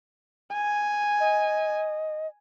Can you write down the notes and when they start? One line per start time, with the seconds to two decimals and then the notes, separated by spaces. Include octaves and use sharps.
0.52 G#5
1.20 D#5